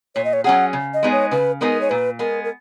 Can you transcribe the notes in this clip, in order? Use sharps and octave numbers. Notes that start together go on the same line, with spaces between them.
A#2 C#5
D#5
C#5
F#3 C#4 G#4 F#5
C#3
D#5
G#3 B3 D#4 G#4
C#5
C#3 B4
G#3 B3 D#4 G#4 A#4
C#5
A#2 B4
G#3 B3 A#4
A#4